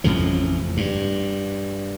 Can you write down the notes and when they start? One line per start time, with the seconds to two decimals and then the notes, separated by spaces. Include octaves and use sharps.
0.04 A1 F2 C#3 F3
0.77 G2